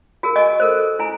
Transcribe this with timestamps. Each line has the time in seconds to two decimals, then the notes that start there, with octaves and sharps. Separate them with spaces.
0.23 F#4 G#4 A#4
0.36 D#5 G#5 C#6 D6
0.60 A4 A#4 C5
0.99 E4 G#5 A#5